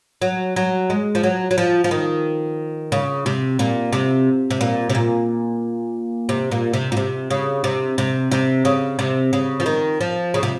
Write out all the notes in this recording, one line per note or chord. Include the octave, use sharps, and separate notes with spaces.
F#3
F#3
G#3
F3
F#3
F#3
F3
F3
D#3
C#3
C3
A#2
C3
C3
A#2
C3
A#2
C3
A#2
C3
A#2
C3
C#3
C3
C3
C3
C#3
C3
C#3
F3
D#3
F3
C#3
C3